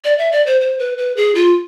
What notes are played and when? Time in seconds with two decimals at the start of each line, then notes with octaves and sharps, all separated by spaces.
0.04 D5
0.18 E5
0.32 D5
0.46 C5
0.61 C5
0.79 B4
0.98 B4
1.17 G#4
1.35 F4